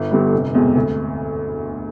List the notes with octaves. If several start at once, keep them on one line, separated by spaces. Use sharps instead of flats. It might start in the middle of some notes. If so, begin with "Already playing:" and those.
Already playing: G1
G2 D3 G3 B3
F1
E2 B2 G#3 C4
D2